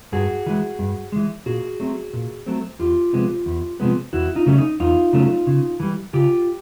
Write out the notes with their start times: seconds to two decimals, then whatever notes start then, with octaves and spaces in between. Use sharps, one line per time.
0.12 G2 F#4 G#4
0.46 E3 G#3
0.79 G2
1.12 E3 G#3
1.46 A#2 F#4 G#4
1.80 F#3 A3 C4
2.13 A#2
2.46 F#3 A3 C4
2.79 E2 F4 G4
3.13 C3 F3 G#3 B3
3.46 E2
3.80 C3 F3 G#3 B3
4.13 E2 E4 F#4
4.35 D#4 F4
4.46 C#3 F#3 A3 C#4
4.58 D#4
4.80 E2 D#4 F4
5.13 C#3 F#3 A3 C#4
5.47 C#3
5.80 E3 G3
6.13 C#3 F4 G4